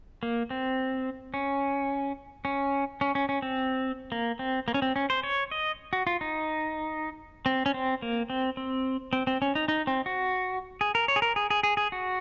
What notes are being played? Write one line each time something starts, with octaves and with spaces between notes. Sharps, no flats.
A#3
C4
C#4
C#4
C#4
C#4
C#4
C4
A#3
C4
A#3
C#4
C4
C#4
C5
C#5
D#5
F#4
F4
D#4
C4
C#4
C4
A#3
C4
C4
C4
C4
C#4
D#4
D#4
C4
F#4
G#4
A#4
C#5
G#4
A#4
G#4
G#4
G#4
G#4
F#4